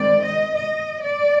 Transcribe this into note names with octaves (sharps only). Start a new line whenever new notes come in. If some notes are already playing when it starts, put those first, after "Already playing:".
Already playing: D#3 G#3 C4 D5
D#5
D#5
D5